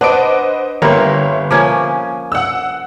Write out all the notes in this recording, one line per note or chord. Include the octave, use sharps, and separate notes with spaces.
D4 B4 C5 D#5 F#5 D6 D7
G1 G3 A#3 A#4 C#5 E5 C6
F3 A#3 C#4 G#5 D6
F#5 E6